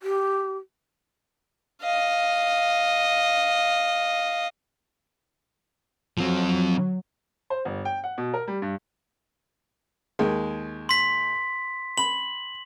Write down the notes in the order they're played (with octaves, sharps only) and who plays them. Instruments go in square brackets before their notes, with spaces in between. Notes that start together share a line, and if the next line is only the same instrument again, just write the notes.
[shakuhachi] G4
[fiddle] D#5 F5
[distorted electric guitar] F3 C4 [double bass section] F#3
[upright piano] C5
G1
G5
F#5
B2
A#4
G3
G2
[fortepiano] D#2 G#3
[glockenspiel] C6 B6
[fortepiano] B5 [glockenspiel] F#7